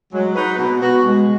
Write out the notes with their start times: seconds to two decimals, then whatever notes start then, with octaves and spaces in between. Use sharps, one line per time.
0.13 F#3 G#3
0.35 D#4 F#4 B4
0.58 B2 B3
0.81 B3 F#4
1.03 B2 G#3